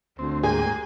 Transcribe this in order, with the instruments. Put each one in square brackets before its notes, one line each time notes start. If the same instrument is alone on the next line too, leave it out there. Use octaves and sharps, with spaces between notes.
[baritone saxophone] D2 [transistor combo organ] C4
[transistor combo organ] G#2 A#3 G5 [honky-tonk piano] G#4 [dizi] G#5